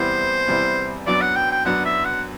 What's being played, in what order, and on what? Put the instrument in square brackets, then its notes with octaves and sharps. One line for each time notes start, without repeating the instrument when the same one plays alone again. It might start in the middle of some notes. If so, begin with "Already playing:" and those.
Already playing: [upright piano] E2 C3 G3 B3 E4 [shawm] C5
[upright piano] E2 C3 G3 B3 E4
[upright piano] F#2 F#3 B3 D4 [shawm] D5
[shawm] F#5
G5
G5
[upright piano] F#2 F#3 B3 D4 [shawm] F#5
[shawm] E5
F#5